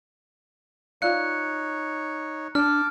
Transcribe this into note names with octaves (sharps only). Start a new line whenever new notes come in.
D#4 F4 C#5 D5 F5 F#6 C#7
D4 A5 D6 F6